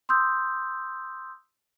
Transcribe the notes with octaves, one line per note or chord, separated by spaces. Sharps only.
C6 D#6 E6 G6